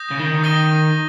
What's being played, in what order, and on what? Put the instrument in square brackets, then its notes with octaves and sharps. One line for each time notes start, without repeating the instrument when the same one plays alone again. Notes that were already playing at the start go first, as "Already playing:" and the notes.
Already playing: [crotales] D#6 G6 A#6
[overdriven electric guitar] C#3
D#3
[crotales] D#6 A#6 D#7 G7